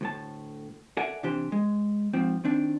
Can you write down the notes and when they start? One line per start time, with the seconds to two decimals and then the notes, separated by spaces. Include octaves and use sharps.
0.01 D2 A2 A5
0.97 A4 A#4 D5 E5 F#5 G#5
1.23 C3 E3 D4 G4 C5
1.52 G#3
2.13 G#2 F3 C4
2.44 D#3 C4 D4